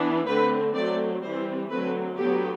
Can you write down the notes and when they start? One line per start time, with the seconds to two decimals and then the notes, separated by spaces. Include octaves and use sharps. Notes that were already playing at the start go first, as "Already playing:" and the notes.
Already playing: E3 B3 D4
0.26 D3 A3 C4 B4
0.73 F#3 A3 C4 D5
1.22 E3 G3 C4 C5
1.69 D3 F#3 A3 C4 B4
2.16 D3 F#3 B3 G4